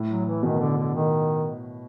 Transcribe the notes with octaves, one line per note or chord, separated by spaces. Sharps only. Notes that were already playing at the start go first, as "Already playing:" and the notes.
Already playing: A2
F#3
E3
B2 D#3
D3
D3
D#3